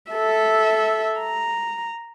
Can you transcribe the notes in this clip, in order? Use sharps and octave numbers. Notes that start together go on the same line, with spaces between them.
A4 E5
A#5